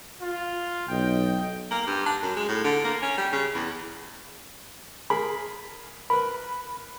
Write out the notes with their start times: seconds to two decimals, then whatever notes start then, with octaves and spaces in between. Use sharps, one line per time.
0.21 F4
0.89 B1 D#5 G5
1.71 A#3
1.87 G2
2.06 D4
2.22 F#2
2.36 G#3
2.49 A2
2.64 D3
2.84 A#3
3.02 C#4
3.18 G3
3.32 C#3
3.54 E2
5.10 G#4 A#4 B5
6.10 A#4 B4 B5